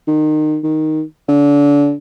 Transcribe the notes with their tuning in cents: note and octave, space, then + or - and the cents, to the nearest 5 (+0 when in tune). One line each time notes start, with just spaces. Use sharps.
D#3 -25
D#3 +0
D3 -30